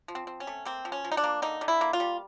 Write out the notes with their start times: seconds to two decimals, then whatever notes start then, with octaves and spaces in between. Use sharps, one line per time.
0.08 F3
0.15 C4
0.27 C4
0.40 C#4
0.47 A3
0.65 A#3 C4
0.85 F3
0.92 C#4
1.04 F3
1.12 D#4
1.17 D4
1.24 A#3
1.42 D3 D#4
1.61 D3
1.68 E4
1.81 A#3
1.93 F4
2.00 G3